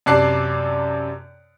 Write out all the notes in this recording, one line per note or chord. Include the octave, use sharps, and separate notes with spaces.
F#2 C3 D5 A5 F#6 C7